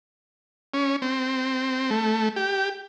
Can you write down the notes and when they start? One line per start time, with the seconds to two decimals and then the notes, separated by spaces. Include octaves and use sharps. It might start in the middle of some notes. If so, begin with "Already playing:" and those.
0.74 C#4
1.02 C4
1.91 A3
2.36 G4